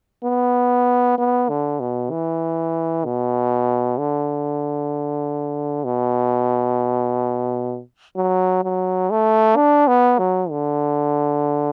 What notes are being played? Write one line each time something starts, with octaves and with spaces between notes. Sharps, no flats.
B3
B3
D3
B2
E3
B2
D3
B2
F#3
F#3
A3
D4
B3
F#3
D3